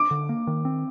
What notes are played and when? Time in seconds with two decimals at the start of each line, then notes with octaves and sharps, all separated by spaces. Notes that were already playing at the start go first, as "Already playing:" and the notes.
Already playing: D6
0.11 D3
0.29 A#3
0.47 D#3
0.65 C4